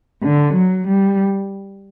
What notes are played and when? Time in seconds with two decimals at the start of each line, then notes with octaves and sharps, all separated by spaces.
0.23 D3
0.54 F#3
0.86 G3